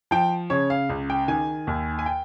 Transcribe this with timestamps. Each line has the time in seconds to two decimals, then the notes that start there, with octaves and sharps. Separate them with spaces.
0.11 F3 G5
0.50 C#3 C#5
0.70 F5
0.89 C#2
1.10 G5
1.28 D#3 G#5
1.67 D#2
1.99 G#5
2.06 G5